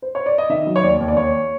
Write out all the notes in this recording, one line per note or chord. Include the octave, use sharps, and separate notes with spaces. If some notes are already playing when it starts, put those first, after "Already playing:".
C5
C#5
D5
D#5
D#3 E5
F#3
C#5
D#2 D5
D#2
D5
D#2 C#5